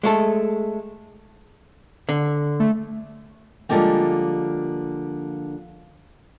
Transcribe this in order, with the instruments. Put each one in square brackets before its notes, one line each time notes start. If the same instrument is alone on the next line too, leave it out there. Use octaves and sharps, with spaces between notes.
[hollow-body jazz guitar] G#3 A3 A4
D3
[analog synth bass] A3
[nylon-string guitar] D3 F3 G3 G#3 A#3 C4